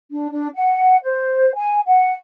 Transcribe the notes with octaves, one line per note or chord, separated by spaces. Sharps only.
D4
D4
F#5
C5
G#5
F#5